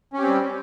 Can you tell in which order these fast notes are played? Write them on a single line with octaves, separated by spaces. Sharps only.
C#4 G4 C4 G3